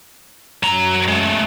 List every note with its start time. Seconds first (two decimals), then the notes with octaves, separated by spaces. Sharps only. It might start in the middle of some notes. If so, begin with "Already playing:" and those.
0.63 F#2 F#3 A#5
1.08 G#3 A3